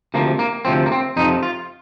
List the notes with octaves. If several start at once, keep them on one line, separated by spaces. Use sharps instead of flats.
D2 C3 F3 A#3
A#3
D2 C3 F3 C4
A#3
C4
F2 C3 F3 D#4
F4